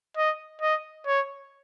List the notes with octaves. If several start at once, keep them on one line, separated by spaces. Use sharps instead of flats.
D#5
D#5
C#5